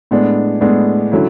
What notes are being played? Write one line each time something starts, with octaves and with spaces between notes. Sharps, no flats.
A2 G#3 B3 D4
A2 G#3 B3 D4
D3 F#3 C#4 E4